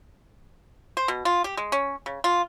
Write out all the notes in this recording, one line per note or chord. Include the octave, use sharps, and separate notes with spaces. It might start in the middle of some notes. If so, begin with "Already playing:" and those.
C5
B2
F4
G4
G#3
C#4
C#3
F4